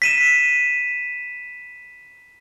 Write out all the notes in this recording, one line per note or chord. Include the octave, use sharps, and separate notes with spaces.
B6 D#7 E7